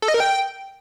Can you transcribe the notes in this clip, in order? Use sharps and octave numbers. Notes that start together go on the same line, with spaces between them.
A4
D#5
A#4
G5